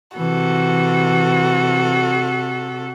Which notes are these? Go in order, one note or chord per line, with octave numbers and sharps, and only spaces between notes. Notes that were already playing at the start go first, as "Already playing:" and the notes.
C3 E3 F#4 A4